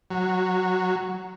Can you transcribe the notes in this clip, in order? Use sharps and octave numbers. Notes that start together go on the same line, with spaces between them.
F#3